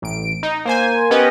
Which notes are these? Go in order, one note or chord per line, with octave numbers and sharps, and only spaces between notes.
A1 D7
D#4
A#3 C5 G#5
B3 C#4 G4 B4 D#5